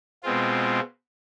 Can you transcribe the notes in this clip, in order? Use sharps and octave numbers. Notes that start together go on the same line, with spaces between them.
B2 G#3 C4 F4